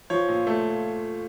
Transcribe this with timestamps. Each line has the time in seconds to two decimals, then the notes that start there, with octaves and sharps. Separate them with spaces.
0.10 F3 C#5
0.29 A#2
0.47 A3